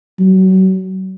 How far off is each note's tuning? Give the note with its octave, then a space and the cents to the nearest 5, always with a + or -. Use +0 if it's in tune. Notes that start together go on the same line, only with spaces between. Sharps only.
F#3 +30